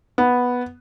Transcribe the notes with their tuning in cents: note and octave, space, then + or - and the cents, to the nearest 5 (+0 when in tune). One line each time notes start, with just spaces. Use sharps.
B3 -5